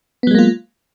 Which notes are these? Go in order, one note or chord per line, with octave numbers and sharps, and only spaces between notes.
F#3 G#3 A#3 B3 F4